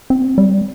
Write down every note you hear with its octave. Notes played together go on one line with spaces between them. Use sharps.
C4
G3